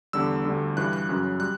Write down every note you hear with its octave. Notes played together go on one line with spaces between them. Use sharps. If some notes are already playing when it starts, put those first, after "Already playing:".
E2 D3 G3 E6
D2 D3 G3
G2 E3 G3 F#6
F#6
F#2 C#3 F#3
G3 F#6